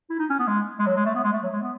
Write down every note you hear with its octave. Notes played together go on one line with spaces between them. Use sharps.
E4
D#4
C#4
B3
G#3
G#3
F#3
G#3
A3
B3
G#3
A3
F#3
G#3
B3